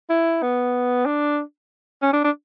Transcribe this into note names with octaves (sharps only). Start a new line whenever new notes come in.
E4
B3
D4
C#4
D4
D4